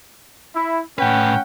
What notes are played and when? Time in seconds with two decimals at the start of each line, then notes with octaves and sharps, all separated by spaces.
0.55 E4
0.99 A2 C#4 B4 F#5 G5